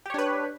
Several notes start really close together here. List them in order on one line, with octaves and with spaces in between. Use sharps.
G4 C#5 D4 B4